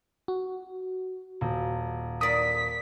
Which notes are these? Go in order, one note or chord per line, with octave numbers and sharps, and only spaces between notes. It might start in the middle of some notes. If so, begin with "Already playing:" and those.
F#4
D#1
A#4 D5 D#6 B6